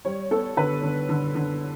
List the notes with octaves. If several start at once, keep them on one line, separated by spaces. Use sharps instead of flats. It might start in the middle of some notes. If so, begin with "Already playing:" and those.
G3 C#5
B3 A4
D3 B4
D3
D3
D3